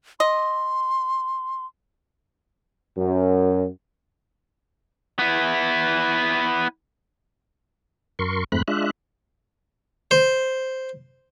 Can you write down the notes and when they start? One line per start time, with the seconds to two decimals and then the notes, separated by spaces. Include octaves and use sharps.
0.20 D#5 C6
2.97 F#2
5.19 B3 E4
8.19 F#2 A#4 C6 C#6
8.52 F2 G#2 A3 C4 B5 F#6
8.68 G#3 D4 F4 E5 F#6
10.11 C5